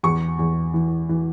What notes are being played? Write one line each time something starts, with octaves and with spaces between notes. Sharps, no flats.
E2 C#6
E2
E3
E3